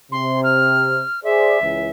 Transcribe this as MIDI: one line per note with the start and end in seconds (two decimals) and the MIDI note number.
0.12 1.00 48
0.12 0.40 84
0.44 1.20 89
1.24 1.60 68
1.24 1.60 72
1.24 1.60 74
1.24 1.90 76
1.61 1.91 37
1.61 1.91 52